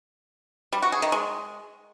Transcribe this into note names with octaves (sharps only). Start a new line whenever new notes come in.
G3
F#4
G#4
D#3
G#3